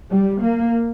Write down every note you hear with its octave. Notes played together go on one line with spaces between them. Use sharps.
G3
A#3